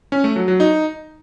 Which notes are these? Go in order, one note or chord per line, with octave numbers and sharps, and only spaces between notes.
C#4
A3
F#3
F#3
D#4